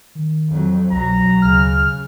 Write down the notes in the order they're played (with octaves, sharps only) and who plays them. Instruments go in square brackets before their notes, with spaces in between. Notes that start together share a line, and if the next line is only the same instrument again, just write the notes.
[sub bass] D#3
[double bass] F2 F#3
[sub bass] C2 [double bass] B2 F#3 [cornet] A#5
[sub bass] D2 [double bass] C#3 [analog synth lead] F6